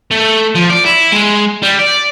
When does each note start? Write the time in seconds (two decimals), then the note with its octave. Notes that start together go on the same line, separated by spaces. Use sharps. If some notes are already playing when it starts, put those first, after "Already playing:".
0.11 A3
0.55 F3
0.70 D5
0.86 E4
1.13 G#3
1.62 G3
1.79 D5